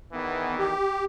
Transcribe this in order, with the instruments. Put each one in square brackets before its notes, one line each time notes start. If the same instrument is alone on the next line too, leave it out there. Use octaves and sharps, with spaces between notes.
[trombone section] E2 D#3 E3 [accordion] B3
[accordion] G4